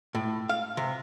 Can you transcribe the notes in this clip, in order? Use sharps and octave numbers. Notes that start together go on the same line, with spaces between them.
A2
F5
C3